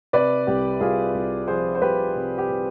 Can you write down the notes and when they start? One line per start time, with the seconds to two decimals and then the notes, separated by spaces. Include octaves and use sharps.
0.13 C3 B4 D5
0.47 C2 G4
0.80 C2 F4 G#4
1.14 C2
1.48 F3 G#4 C5
1.75 C5
1.81 C2 G4 B4
2.15 C3
2.38 G4
2.49 C3